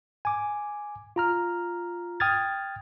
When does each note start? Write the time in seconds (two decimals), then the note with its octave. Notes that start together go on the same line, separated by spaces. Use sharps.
0.25 G#5 D6
1.16 F4 A#5 F6
2.20 G5 D#6 F6 G#6 A6